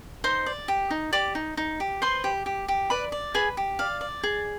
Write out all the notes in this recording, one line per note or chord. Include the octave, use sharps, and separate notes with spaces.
D#4 C5 C6
D5
G4
D#4
G4 D5 D6
D#4
D#4
G4
B4 C5 C6
G4
G4
G4
B4 D5 B5
D5
G#4 B4 G#5
G4
D5 F5
D5
G#4